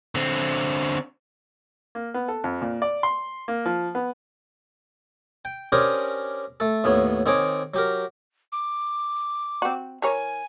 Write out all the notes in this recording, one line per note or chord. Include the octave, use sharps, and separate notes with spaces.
D3 C4
A#3
B3
A4
F2
A#2
D5
C6
A#3
F3
B3
G5
C#4 D4 G4 G#4 A#4 C5
A3 A4
D#2 A2 B3 C#5
D#3 C4 G#4 C#5 D6
F#3 G4 A#4
D6
C4 F#4
E3 A#4 C#5 G#5